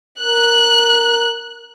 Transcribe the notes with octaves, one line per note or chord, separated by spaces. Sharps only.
A#4 F#6